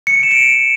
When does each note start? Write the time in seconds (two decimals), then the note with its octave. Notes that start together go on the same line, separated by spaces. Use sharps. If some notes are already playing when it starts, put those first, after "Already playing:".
0.07 C#7
0.15 D7
0.23 E7
0.31 D7